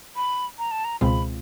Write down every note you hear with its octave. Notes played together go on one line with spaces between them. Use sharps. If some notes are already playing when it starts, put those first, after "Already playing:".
B5
A#5
A5
A#5
C#2 B2 G#3 C4 F4 B5